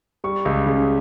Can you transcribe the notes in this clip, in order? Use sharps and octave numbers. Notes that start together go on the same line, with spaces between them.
G3 C#6
C#2
C#3